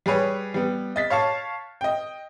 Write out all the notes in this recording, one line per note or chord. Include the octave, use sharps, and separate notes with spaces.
G3 G#4 B4 C#5
G3 B3
D#5 A6 B6
C#5 F5 A5 C#6
D#5 G5